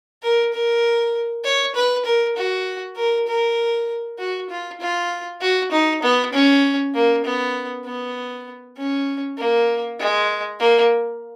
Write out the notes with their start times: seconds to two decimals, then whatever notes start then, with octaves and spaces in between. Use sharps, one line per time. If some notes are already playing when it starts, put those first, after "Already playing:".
0.23 A#4
0.53 A#4
1.44 C#5
1.75 B4
2.05 A#4
2.37 F#4
2.96 A#4
3.27 A#4
4.18 F#4
4.50 F4
4.81 F4
5.41 F#4
5.72 D#4
6.03 B3
6.33 C#4
6.94 A#3
7.25 B3
7.85 B3
8.77 C#4
9.38 A#3
9.99 G#3
10.60 A#3